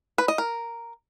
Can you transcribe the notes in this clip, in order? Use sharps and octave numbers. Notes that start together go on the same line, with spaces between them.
B4
D#5
A#4